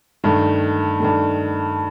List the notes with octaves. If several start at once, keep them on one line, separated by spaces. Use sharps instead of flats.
G2 D#3 A3
G2 D#3 A3